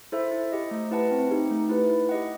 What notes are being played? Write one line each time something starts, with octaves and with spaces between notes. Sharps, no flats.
E4 A4 C5 E5
E4
G4 D#5
A3
E4 B4 F#5 A5
C4
D#4 G4
A3
E4 B4
E4
G4 D#5 F#5